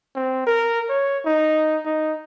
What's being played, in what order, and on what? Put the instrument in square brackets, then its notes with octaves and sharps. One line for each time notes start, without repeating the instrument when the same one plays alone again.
[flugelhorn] C4
A#4
C#5
D#4
D#4